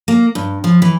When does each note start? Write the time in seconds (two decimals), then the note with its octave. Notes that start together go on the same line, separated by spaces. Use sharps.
0.08 A#3
0.35 G2
0.64 F3
0.82 E3